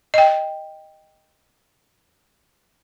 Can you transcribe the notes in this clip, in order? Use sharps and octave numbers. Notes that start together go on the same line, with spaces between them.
D#5 G5